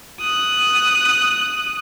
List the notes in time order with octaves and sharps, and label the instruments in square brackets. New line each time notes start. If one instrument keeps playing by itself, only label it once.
[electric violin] D#6 F#6